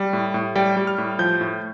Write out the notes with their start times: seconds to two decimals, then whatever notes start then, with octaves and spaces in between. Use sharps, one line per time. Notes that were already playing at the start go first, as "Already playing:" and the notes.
Already playing: G3
0.13 A2
0.34 A2
0.56 G3 G5
0.77 G3
0.87 F6
0.98 A2
1.19 F3 G6
1.41 A2